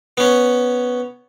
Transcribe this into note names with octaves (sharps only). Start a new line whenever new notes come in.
B3 C#4